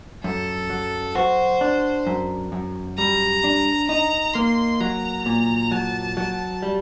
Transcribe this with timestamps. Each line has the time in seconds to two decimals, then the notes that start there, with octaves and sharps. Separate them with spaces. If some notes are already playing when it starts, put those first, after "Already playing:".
0.24 F#2 A4
0.70 F#3
1.15 F#4 C5
1.61 D4
2.07 F#2
2.52 F#2
2.98 G3 A#5
3.44 D4
3.89 D#4 A#5
4.34 A#3 C6
4.80 F#3 A#5
5.26 A#2
5.71 F#3 A5
6.17 F#3
6.62 G3